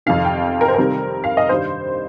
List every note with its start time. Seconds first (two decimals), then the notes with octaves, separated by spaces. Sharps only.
0.06 F2 C3 D#3 F5
0.25 G5
0.61 A#4
0.68 C5
0.74 C3 D#3 G3 C4 A#4
1.24 F5
1.37 D#5
1.49 G2 D#3 G3 C5